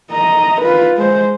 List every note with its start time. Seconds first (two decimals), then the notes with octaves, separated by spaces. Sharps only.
0.12 D#5 A#5
0.61 F4 B4
0.97 G#3 C5